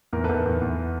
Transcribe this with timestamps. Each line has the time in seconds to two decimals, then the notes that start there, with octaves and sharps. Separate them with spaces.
0.13 E2 A#4
0.24 A4 B4
0.29 E2
0.34 A4
0.45 E2
0.62 E2